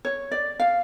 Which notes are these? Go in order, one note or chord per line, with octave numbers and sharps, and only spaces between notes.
C#5
D5
F5